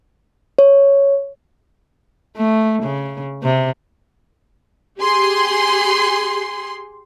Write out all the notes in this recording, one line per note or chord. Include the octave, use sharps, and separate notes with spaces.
C#5
A3
C#3
C3
G4 G#4 C6